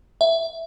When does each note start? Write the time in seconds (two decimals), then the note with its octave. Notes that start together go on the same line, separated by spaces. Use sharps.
0.21 E5